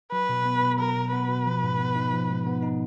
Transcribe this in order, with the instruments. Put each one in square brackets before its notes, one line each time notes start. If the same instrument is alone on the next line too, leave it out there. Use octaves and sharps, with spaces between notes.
[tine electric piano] F#3 [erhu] B4
[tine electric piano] B2
B3
B2
[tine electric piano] F#3 [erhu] A#4
[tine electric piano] B2
[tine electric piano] B3 [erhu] B4
[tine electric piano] B2
F3
G#2
B3
D#4
F3
G#2
B3
D#4